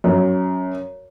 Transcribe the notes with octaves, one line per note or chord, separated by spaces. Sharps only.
F#2